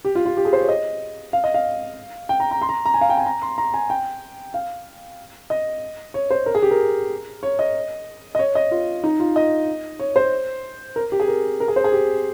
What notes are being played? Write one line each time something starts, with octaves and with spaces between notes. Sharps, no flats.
G4
F4
F4
G4
G#4
C5
C#5
D#5
F5
D#5
F5
G5
A#5
A#5
C6
A#5
A#5
G#5
F5
G5
G#5
A#5
C6
A#5
G#5
G5
F5
D#5
C#5
C5
A#4
G#4
G4
A#4
C#5
D#5
D#5
C#5
D#5
F4
D#4
F4
D#5
C#5
C5
A#4
G4
G#4
A#4
A#4
G#4
C5
G#4
G4